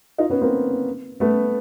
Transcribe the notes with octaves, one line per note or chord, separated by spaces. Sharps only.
D#4 F4
B3 C#4
A#3 C4
A3 B3